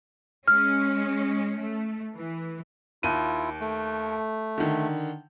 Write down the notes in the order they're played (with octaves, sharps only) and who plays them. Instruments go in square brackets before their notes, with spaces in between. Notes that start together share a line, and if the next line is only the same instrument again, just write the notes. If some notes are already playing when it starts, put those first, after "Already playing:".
[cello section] G#3 C#4 [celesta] F6
[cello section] A3
E3
[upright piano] D#2 D#7 [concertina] E4 F4
[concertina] A3
[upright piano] D3 D#3